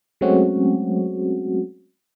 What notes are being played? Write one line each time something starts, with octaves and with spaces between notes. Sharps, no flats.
F#3 G#3 A3 C4 C#4 F#4